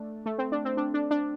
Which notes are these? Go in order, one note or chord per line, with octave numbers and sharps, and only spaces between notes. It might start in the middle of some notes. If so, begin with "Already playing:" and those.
Already playing: A3 D4
A3
C4
D4
C4
D4
D4
D4